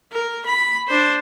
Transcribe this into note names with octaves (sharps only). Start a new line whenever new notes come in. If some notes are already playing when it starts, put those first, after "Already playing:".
A#4
B5
D4 C5